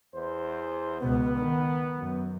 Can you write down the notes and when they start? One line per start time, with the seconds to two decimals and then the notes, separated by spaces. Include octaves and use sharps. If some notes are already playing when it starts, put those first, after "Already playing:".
0.14 E2 C5
1.01 C#2 B2 B3
1.38 D#3
1.98 F#2